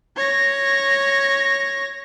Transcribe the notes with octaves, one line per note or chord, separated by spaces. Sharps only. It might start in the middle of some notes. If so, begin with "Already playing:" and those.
C#5 A#6